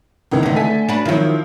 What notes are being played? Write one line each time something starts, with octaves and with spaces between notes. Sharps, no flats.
C#2 D#3 E3
D3 A3
A4 G#5 B6
D4 F#4 B4
D#3 F3 F#3 E4 F4